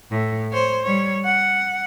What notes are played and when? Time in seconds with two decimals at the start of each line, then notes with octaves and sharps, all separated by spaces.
0.11 A2
0.52 C5 C#5
0.83 G3 C#5
1.25 F#5